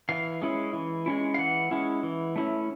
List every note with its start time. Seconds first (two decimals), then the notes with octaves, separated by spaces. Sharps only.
0.09 E3 F5
0.42 G#3 C#4 E4
0.73 E3
1.06 G#3 C#4 E4
1.34 F5
1.38 E3 F#5
1.71 G#3 C#4 E4
2.03 E3
2.36 A3 C#4 E4